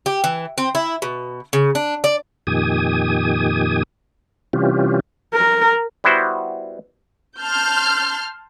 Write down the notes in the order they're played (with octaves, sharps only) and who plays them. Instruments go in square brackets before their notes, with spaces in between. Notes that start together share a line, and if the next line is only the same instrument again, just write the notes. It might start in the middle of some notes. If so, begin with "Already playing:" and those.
[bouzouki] G4
E3
C4
E4
B2
C#3
D4
D5
[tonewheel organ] F2 A#2 D#3 G4 G#5 D#6
C3 E3 G3 C#4 F4 G4
[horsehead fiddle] A#4
[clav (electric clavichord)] G3 B3 E4 F#4 C5
[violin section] A5 C6 F6 G6